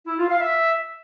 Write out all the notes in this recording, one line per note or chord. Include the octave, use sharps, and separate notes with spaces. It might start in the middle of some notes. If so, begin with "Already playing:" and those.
E4
F4
F5
E5